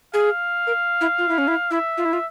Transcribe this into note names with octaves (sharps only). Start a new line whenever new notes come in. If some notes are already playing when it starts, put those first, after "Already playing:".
G#4 F5
A#4
E4
F4
E4
C#4
E4
E4 E5
F4
E4
F4